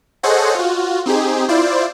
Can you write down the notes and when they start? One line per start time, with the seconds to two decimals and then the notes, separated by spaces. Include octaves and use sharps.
0.23 G#4 A4 C5 C#5 D#5 F#5
0.55 F4 F#4
1.06 C4 D#4 G4 G#4
1.48 E4 F4 C5 D5